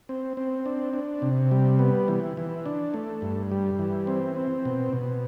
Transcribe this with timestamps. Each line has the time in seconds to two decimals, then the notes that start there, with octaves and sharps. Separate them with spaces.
0.09 C4
0.37 C4
0.66 D4
0.94 D4
1.22 C3
1.51 G3
1.79 B3
2.08 E3
2.37 E3
2.66 D4
2.94 A3
3.22 G2
3.51 G3
3.79 E3
4.07 C4
4.36 C4
4.65 B2
4.93 B2